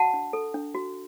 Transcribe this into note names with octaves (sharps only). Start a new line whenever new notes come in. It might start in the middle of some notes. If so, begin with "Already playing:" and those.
Already playing: F#4 F#5 A5
D4
A4
D4
F#4